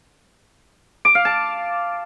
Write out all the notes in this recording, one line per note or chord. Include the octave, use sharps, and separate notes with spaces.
D6
F5
A5